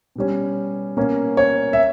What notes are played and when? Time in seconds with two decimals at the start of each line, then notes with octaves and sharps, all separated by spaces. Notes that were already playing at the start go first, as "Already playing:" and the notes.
0.16 B2 G3 C#4
0.97 B2 A#3 C#4
1.37 C#5
1.73 E5